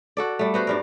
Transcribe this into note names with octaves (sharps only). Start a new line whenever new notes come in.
F#4 A4 D5
G3 A3
B3 F#4 C5
G2 G3 A#4